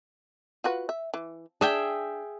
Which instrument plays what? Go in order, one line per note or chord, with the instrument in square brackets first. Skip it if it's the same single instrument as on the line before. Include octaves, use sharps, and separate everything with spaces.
[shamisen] F4 F#4 B4
E5
E3
[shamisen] D4 [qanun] G#4 E5 G5